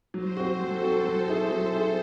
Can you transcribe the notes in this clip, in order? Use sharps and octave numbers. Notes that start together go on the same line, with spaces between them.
F#3 C5
C4 F#4
F#3 A4
C4 F#4
F#3
C4 E4 G#4
F#3
C4 E4 G#4